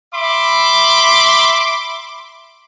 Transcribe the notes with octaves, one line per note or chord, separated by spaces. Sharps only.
E5 B5 C6 D6